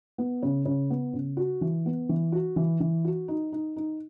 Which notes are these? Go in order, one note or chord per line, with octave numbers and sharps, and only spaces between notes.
B3
C#3
C#3
B3
C#3
F#4
E3
B3
E3
F#4
E3
E3
F#4
D#4
D#4
D#4